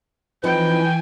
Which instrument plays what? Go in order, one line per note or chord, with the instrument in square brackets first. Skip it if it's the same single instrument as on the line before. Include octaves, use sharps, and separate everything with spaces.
[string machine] E3 G#5 [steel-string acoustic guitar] F3 C4 D#4 [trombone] B4 [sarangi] G5